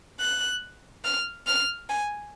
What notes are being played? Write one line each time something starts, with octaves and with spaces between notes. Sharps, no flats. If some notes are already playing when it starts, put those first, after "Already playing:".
F#6
F6
F6
G#5